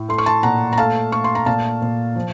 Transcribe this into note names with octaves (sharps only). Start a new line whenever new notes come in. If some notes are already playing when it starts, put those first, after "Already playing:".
Already playing: A2
A3 C6
C#6
A5 C6
A#2 F#5 A#5
A#5
A3 F5 A5
A3 C#6
C6
A#5
A#2 F5 A5
A#2
F3